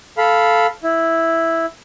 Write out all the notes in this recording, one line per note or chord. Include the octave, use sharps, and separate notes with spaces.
A4 F5 B5
E4